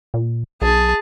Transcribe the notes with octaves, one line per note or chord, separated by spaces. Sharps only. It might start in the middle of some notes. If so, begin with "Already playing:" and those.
A#2
B1 G#4 A5